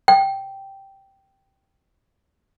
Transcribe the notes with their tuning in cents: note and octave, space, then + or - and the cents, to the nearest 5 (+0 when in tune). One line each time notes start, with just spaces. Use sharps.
G5 -5